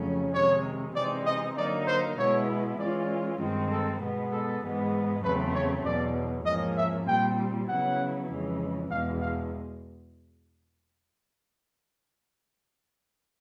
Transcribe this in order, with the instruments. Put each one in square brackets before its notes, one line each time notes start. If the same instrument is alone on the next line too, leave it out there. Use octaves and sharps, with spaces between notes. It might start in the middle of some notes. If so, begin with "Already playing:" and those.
Already playing: [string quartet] F2 C#3 F#3 A3 C#4
[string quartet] C3 D#3 G#3 [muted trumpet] C#5
[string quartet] C3 E3 G#3 C4 D#4 [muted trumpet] D5
[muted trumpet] D#5
[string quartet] D3 F#3 A#3 D#4 [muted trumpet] D5
[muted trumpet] C5
[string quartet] B2 G#3 B3 E4 [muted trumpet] C#5
[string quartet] E3 G#3 C#4 F4 [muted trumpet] D5
[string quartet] G2 D#3 G#3 C4
[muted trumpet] A4
[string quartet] B2 G#3 B3
[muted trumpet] A4
[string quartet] G#2 E3 G#3 B3
[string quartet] E2 C#3 F#3 A3 C4 [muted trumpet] B4
[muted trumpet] C#5
[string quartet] E2 B2 F#3 [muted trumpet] D5
[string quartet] G#2 F3 A#3 C#4 [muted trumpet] D#5
[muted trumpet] E5
[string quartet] A#2 G3 C4 [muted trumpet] G5
[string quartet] C#3 F#3 B3 E4 [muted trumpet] F#5
[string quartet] F2 C#3 E3 G#3
[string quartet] E2 B2 G#3 [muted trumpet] F5
[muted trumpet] F5